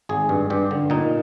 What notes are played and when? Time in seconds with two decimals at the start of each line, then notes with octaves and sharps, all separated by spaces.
0.09 G#1 G#4
0.29 G2
0.50 G2 G4
0.71 D3
0.90 A#2 D#4